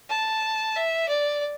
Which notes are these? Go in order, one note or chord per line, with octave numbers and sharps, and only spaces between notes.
A5
E5
D5